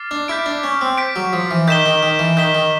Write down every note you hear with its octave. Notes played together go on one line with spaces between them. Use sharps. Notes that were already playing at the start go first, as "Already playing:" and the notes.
Already playing: D6 F6 A6 C7
D4
E4 G6 B6 D7
D4
C#4
C4
G6 B6 D7
F#3
F3
E3
D#3 G6 B6 E7 G7
D#3
D#3
E3
D#3 G6 B6 E7 G7
D#3